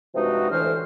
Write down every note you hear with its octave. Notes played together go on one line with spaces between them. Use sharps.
G2 C3 F3 G#3 D#4 F#4
D2 A2 D3 E3 C5 F6